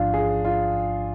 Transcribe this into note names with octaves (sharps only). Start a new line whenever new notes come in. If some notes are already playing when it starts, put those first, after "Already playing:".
Already playing: A1 G#2 F3 D4 F4
G#4
F4